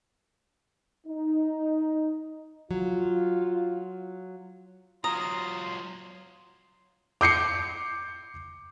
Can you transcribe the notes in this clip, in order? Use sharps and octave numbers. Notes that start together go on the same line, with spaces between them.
D#4
F#3 F4
F#3 F4 A#5 C6 D#6
D6 G6 C7 C#7